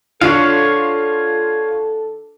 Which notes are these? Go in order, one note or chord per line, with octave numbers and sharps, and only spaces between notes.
D3 F4 A4 C#5 F5